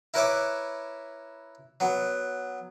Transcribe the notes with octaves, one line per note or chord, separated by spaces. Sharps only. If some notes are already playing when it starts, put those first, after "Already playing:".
E4 A#4 B4 C#5 E5 D6
F#3 B3